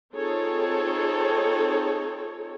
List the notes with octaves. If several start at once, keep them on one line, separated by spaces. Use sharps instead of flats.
C4 D#4 F4 G#4 A4 C#5